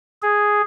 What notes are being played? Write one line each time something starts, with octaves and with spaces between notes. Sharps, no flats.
G#4